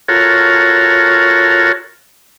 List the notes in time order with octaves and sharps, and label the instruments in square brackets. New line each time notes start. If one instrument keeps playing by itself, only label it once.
[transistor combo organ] F4 F#4 A4 A#4 C#5